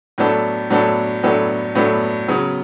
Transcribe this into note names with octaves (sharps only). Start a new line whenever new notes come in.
A2 F#3 B3 D4 A4
A2 F#3 B3 D4 A4
A2 F#3 B3 D4 A4
A2 F#3 B3 D4 A4
C#3 F#3 B3